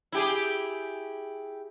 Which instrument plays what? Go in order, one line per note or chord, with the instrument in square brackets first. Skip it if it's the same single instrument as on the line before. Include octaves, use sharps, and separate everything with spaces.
[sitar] E4 G4 G#4